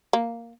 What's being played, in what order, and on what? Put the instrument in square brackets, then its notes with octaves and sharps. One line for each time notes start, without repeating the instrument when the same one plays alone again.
[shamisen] A#3